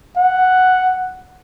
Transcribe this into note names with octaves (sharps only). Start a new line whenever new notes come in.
F#5